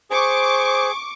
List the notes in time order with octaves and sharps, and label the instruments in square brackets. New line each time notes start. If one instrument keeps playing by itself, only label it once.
[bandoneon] G#4 [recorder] C5 [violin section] C#6 D6